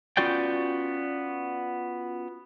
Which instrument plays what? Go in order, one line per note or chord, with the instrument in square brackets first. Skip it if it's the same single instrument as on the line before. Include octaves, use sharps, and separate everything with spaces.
[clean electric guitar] B3 C#4 F4 F#4 D5 G5